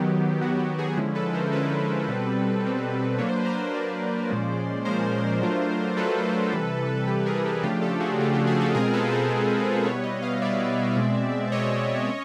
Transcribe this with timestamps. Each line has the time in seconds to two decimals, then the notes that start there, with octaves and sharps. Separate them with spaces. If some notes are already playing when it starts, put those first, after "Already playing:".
Already playing: D#3 F#3 B3 G4
0.41 D#3 F#3 B3 F#4
0.59 G4
0.78 F#4 G#4
0.97 D3 F3 G#3 C#4 E4
1.15 A4 B4
1.34 A#4 C5
1.52 D3 F3 G#3 C#4 E4 A4 B4
2.08 B2 G3 C4
2.64 B2 G3 C4
3.19 F#3 A#3 D4 C#5
3.28 C5
3.36 B4
3.45 A#4 C5
3.74 F#3 A#3 D4 C5 D5
4.30 A#2 F3 G#3 C#4
4.85 A#2 F3 G#3 C#4 A#4 C5
5.42 F#3 A3 D4 F4
5.97 F#3 A3 D4 F4 A4 B4
6.53 C3 E3 G3
7.07 C3 E3 G3 G4 A4
7.26 G#4 A#4
7.46 G4 A4
7.63 C#3 F3 A3 D4 F4 G4
7.82 G4 A4
8.00 F#4 G#4
8.18 C#3 F3 A3 D4 F4 G4
8.34 G4
8.47 F#4 G#4
8.60 G4 A4
8.75 B2 G#3 C4 F4 G#4 A#4
8.93 A4 B4
9.11 A#4 C5
9.30 B2 G#3 C4 F4
9.85 B2 G3 B3 E4 B4 C#5
10.04 C#5 D#5
10.22 D#5 F5
10.42 B2 G3 B3 E4 D5 E5
10.96 B2 G#3 C4
11.52 B2 G#3 C4 C#5 D#5
12.08 C#4